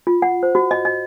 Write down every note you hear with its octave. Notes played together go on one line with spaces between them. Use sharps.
F4
F#5
C5
F#4
D#5
D#5